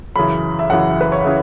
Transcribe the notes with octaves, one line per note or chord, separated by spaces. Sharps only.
F#2 C#3 E3 B5
E5
F#2 C#3 E3 F#5
B4
C#5
C#3 E3 E5